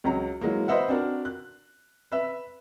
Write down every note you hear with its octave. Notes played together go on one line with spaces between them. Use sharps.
C#2 F#3 A#5
E3 F#3 G#3 A#3
B4 C5 D#5 E5 F#5
C4 D4 F#4 A#4
F#6
B4 E5